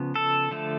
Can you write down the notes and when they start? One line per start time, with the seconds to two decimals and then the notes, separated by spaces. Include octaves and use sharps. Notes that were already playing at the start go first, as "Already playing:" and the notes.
Already playing: C#3 F3 B3
0.16 A4
0.51 D3 F3 A3